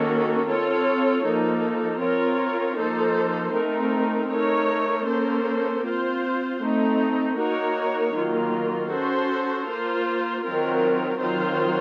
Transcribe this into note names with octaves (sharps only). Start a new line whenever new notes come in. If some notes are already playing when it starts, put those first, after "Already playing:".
Already playing: D#3 A#3 C#4 F#4 A4
C4 F4 A4 C#5
F3 A#3 D#4 A4
C4 F4 A#4 C#5
F3 A#3 D#4 A4 C5
A3 C4 D#4 A#4
A3 D#4 A#4 C#5
A#3 C#4 A4 C5
C4 F4 C5
A3 C4 D#4
A#3 D#4 F#4 A#4 C#5
D#3 F#3 A#3 F4
C#4 F#4 A4 C5
A#3 F4 C5
D#3 F#3 C4 F4 A#4
D#3 F#3 C4 F4 C5